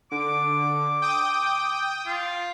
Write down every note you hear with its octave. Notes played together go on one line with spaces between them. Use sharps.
D3 D6
G5 D#6
F4